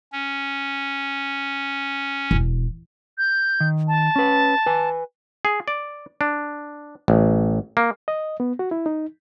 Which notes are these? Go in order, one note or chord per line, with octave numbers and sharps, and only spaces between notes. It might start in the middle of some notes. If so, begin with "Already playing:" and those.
C#4
E1
G6
D#3
A5
C#4 B4
B4 G#5
G#4
D5
D4
A1
A#3
D#5
B3
F#4
E4
D#4